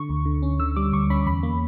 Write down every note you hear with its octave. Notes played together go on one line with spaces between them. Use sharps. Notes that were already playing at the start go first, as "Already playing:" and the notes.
Already playing: D3 C#6
D2
D3
C#4
D3 E6
G3 D6
D2 C#6
C#4 B5
E2 B5
A#3